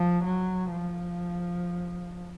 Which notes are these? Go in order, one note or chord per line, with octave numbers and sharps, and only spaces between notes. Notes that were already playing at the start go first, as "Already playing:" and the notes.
Already playing: F3
F#3
F3